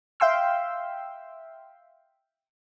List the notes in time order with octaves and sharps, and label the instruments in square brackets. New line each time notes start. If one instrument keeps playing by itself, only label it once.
[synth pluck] E5 F5 G5 C6 E6